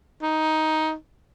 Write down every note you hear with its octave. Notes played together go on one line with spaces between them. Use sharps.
D#4